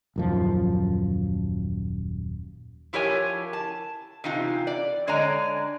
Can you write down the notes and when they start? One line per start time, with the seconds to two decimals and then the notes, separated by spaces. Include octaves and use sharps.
0.16 D#1 F#2 F3
2.93 F3 E4 G4 A#4 C#5 G#5
3.53 A5
4.24 C3 E3 D#4 F4
4.67 D5
5.07 D3 G#3 C#5 D5 G#5 A#5